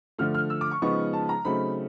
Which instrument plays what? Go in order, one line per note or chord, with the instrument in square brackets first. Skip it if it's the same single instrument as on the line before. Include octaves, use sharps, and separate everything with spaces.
[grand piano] D3 F3 A3 F6
F6
E6
D6
C#6
C#3 F3 G#3 B3 D#4 C#6
A5
A#5
C#3 F#3 A3 C4 D#4 B5